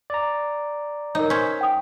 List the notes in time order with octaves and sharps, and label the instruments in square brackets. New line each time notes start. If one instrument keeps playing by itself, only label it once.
[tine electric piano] D5 A#5
[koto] D#4 [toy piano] A#4 C#5
[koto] C#4 C5 [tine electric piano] B6
[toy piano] G5 D#6